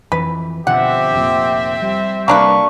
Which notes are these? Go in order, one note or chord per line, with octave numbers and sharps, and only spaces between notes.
F2 E3 B4
B2 D3 F3 C4 G4 E5 F#5
F1 F2 A#2
G3
C3 G3 A#3 D4 B4 C#6